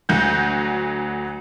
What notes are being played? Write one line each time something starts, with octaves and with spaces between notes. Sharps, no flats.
D2 F#3 F#4 G6